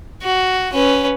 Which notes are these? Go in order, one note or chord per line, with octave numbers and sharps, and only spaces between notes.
F#4
C#4 B4